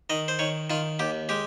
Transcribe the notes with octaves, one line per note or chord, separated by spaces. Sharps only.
D#3 D#5
C5
D#3 C#5
D#3 F4
D#2 G4
G#3 G4